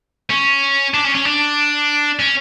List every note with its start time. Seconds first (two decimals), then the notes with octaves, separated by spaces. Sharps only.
0.30 C#4
0.94 D4
1.04 C#4
1.15 C#4
1.25 D4
2.19 C#4